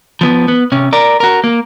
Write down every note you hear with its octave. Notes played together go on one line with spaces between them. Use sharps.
F3 B3
B3
C3 C#4
A#4 D5
F#4 A#4
A#3